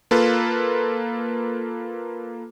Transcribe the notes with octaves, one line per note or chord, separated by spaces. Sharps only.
A#3 F4 A4 B4